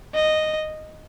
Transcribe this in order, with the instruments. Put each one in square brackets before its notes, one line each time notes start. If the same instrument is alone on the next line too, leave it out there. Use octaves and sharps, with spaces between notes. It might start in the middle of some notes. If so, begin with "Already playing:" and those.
[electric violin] D#5